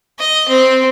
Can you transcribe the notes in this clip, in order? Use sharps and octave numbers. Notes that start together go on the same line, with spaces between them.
D#5
C4